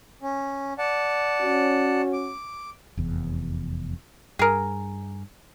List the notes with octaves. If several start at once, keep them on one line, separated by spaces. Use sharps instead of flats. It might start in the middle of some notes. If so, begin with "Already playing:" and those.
C#4
D5 F#5 A5
C#4 F#4
D6
F1 E2
G2 G#4 A#4